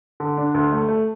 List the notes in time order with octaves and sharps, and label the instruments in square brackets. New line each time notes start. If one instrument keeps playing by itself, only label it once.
[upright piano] D3
D4
D2
A3
A3